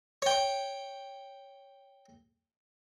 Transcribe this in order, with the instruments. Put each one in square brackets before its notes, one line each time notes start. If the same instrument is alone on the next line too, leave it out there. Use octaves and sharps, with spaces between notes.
[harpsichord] C#5 G5